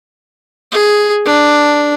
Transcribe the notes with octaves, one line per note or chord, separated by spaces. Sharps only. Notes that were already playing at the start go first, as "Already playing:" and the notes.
G#4
D4